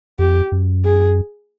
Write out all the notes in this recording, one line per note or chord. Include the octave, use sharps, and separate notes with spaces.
F2 G4
F#2
G#4